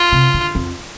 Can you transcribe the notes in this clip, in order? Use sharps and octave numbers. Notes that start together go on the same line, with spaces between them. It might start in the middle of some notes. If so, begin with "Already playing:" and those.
Already playing: F4
C3
D3
F2